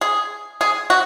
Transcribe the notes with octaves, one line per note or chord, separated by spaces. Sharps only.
G#4
G#4
F#4